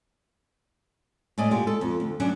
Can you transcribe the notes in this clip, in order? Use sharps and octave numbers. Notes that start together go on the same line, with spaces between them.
A2 G#3 D5 D#5
A#2 G#3 G4
A4
F2
D2
F#2 F#3 C#4 D4